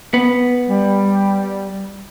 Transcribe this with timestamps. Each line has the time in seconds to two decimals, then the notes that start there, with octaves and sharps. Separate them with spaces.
0.14 B3
0.67 G3